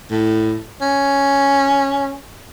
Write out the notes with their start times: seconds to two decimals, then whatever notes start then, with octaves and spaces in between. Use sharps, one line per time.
0.11 A2
0.81 C#4